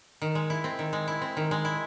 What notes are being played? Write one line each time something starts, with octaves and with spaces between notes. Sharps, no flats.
D#3
G#3
E4
C4
D#3
G#3
E4
C4
D#3
G#3
E4